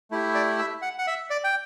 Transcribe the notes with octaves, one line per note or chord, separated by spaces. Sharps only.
A3 E4 G4
D5
E5
F#5
F#5
E5
D5
G5